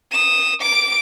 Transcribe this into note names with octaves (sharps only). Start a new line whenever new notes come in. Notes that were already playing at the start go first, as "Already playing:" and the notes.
D#6 E7
D6 D7